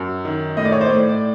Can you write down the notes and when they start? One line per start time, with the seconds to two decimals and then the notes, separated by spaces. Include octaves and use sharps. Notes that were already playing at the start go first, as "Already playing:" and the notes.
Already playing: F#2
0.25 D#3
0.57 A2 D#5
0.65 D5
0.72 C#5
0.81 C5 D5
0.89 A2
1.09 D5